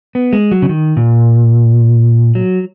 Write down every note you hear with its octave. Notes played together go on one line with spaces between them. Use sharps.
B3
G#3
F#3
C#3
D#3
A#2
F#3